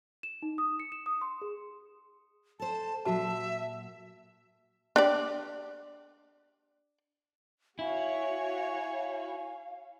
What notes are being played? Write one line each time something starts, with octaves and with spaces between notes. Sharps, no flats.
E7
D#4
D#6
C#7
E7
D#6
C6
G#4
A4 C5 A5
A#2 F#3 F#4 B4 E5 A5
D4 G4 D5
E4 F#4 C#5 F5 G#5